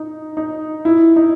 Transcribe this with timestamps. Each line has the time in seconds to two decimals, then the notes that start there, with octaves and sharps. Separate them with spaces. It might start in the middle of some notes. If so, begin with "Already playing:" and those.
Already playing: D#4
0.37 D#4
0.85 E4
1.16 D#4